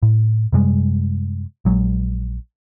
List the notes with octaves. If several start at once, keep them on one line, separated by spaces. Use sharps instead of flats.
A2
F#2 C3 G3 G#3
A#1 F#3 G#3